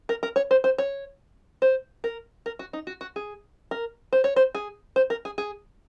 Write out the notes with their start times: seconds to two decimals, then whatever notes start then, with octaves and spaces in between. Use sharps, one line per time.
0.09 A#4
0.23 A#4
0.36 C#5
0.51 C5
0.64 C5
0.78 C#5
1.62 C5
2.04 A#4
2.46 A#4
2.59 F#4
2.73 D#4
2.87 F#4
3.01 F#4
3.16 G#4
3.71 A#4
4.13 C5
4.24 C#5
4.36 C5
4.55 G#4
4.96 C5
5.10 A#4
5.25 G#4
5.38 G#4